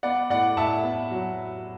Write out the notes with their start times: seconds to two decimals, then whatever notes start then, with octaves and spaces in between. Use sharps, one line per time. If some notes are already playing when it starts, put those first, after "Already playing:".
0.03 B3 D5 F#5
0.30 A2 D5 F#5
0.57 A2 E5 A5
0.84 B3
1.11 F#3